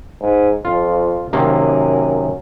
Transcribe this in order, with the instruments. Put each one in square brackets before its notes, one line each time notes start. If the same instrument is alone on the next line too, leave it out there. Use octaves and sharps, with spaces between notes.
[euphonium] G#2
[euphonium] F2 [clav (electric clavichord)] F4
[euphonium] F#2 [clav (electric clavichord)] C3 D#3 A#3